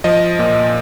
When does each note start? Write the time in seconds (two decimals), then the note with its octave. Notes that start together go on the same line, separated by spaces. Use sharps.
0.04 F3 D#5
0.39 A#2